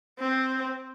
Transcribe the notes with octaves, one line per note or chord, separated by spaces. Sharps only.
C4